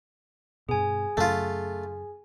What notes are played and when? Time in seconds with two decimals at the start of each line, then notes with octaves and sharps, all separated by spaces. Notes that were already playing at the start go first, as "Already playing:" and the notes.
0.69 G2 B2 G#4 G#5
1.17 F#2 C#3 A3 F4